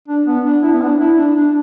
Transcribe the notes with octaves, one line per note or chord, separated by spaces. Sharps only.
D4
B3
D4
E4
B3
D4
E4
D4
D4